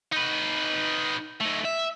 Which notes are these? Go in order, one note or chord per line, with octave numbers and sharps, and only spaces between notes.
D#4 B4
A3 D#4
E5